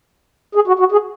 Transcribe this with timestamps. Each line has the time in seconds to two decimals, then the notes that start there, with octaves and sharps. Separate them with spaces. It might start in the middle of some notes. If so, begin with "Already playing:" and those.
0.55 G#4
0.67 F#4
0.79 F#4
0.92 G#4